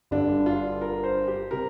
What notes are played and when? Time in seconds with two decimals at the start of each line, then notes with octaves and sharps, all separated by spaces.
0.11 G1 G2 D3 G3 D4
0.46 F4
0.82 A#4
1.04 C5
1.28 G4
1.51 C3 G3 A#4